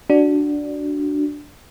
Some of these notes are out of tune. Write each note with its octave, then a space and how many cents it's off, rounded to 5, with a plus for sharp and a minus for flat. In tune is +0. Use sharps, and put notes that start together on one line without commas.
D4 +0 F#4 +5